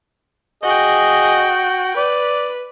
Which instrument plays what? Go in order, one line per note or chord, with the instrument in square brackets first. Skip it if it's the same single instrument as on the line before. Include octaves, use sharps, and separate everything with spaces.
[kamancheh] F#4 G5 [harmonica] G#4 D#5
[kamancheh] B4 [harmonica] D5